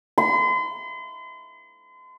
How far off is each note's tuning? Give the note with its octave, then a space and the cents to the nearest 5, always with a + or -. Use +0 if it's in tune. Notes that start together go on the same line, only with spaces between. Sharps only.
C6 -40